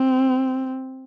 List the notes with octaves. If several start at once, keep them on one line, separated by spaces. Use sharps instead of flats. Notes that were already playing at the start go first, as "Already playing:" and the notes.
Already playing: C4